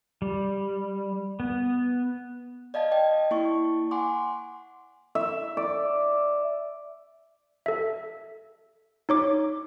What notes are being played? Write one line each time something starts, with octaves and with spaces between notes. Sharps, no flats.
G3
B3
D5 D#5 F5 A5 G#6
D5 D#5 G5
A#3 E4 D5 A5 C#6
F#5 G#5 C6 D6
E5
D5
A4 E5
D#4 C#5 D6